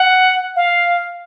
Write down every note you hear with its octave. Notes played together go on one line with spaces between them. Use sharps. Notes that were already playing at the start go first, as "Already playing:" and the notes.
Already playing: F#5
F5